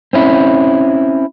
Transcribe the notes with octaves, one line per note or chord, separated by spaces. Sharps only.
C4 C#4 E4